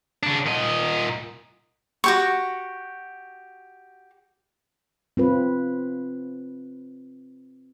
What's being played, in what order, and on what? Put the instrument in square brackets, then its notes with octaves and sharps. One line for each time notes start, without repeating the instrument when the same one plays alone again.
[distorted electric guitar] C#3 D4
A#2 D#5
[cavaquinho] F#4 G4 C#6
[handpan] C4 F4 B4